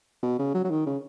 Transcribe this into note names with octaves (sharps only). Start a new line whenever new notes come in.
B2
C#3
F#3
F#3
D#3
C#3